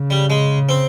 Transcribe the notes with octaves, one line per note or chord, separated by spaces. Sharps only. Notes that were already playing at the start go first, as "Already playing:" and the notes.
Already playing: C#3
G3
G#3
C4